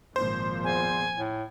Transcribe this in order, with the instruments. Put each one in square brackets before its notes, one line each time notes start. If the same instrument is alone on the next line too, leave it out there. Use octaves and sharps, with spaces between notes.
[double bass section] G#1 A#2 F3 [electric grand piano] C5
[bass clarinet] E2 [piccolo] G#5
[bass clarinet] A2